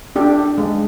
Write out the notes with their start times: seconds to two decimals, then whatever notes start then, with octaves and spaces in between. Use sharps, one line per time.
0.16 D4 G4
0.58 G#3